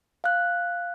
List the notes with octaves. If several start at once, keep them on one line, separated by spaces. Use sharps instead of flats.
F5 F#6